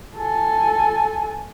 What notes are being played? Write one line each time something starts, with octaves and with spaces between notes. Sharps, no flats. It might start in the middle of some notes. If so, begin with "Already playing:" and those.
A4 G#5